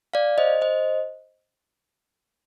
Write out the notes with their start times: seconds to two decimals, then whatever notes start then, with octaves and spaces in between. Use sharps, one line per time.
0.14 D5 F5
0.38 C5 D#5
0.62 C5 D#5